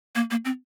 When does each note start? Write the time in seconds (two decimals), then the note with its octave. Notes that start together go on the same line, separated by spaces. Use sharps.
0.15 A#3
0.31 A#3
0.45 C4